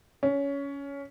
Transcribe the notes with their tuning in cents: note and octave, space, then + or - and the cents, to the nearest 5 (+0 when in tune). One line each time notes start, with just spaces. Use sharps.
C#4 +15